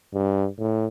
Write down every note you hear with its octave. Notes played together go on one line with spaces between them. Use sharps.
G2
A2